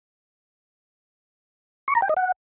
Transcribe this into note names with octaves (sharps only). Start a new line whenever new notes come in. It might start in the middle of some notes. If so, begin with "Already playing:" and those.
C#6
A#5
G5
D#5
F#5